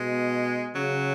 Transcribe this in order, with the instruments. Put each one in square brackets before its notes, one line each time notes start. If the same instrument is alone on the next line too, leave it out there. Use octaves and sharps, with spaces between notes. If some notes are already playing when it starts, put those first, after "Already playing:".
Already playing: [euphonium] B2 [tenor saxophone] G#3
[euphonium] C#3 [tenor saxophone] F#3